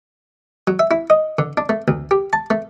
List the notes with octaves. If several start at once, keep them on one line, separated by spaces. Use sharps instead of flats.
F#3
E5
E4
D#5
D3
D4
A3
D2
G4
A5
A3